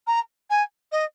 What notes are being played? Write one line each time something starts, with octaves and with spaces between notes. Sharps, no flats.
A#5
G#5
D#5